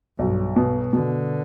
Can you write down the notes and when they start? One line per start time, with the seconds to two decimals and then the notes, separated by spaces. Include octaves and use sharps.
0.19 B1 G2
0.56 B2
0.93 B2 D3